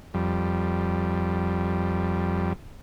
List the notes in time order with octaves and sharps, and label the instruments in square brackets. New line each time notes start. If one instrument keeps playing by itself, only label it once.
[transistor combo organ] F2 G3